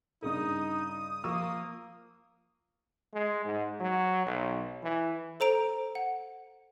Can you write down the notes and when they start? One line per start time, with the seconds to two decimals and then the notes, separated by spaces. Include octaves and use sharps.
0.22 G2 C#3 D#4 A#4 D#6
1.24 F3 A#3 C#6 E6
3.14 G#3
3.45 G#2
3.80 F#3
4.26 B1
4.83 E3
5.40 A4 C5 A#5 D7
5.95 F#5